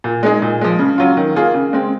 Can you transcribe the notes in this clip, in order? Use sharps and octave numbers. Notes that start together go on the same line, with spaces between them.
A#2
G#3 D#4 G#4
A#2
F3 G#3
C#3
F#3 C#4 F4
D#3
A#3 F4 G#4
C#3
G#3 C4